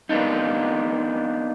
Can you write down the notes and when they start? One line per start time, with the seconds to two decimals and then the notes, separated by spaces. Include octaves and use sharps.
0.09 A#3 B3 D4 D#4